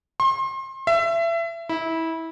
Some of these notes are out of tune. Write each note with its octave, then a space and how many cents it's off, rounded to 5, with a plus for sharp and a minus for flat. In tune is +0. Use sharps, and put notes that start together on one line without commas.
C6 +35
E5 +30
E4 -20